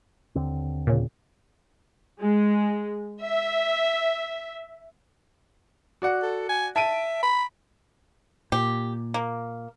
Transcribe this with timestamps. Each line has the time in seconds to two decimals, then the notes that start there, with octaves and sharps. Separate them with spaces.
0.35 D#2 D3 C4
0.87 A#2 C#3
2.21 G#3
3.22 E5
6.02 F#4 D5 F#5
6.22 A4
6.49 G#5
6.76 E5 A5 D7 D#7
7.23 B5
8.52 A#2 G4
9.14 A#3